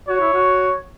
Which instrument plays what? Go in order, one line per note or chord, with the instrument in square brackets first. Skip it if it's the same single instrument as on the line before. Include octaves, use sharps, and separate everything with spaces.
[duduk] F#4 [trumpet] C#5
[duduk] E4
F#4